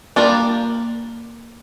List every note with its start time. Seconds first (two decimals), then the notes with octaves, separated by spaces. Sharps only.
0.16 G3 A#3 D4 F4 A#4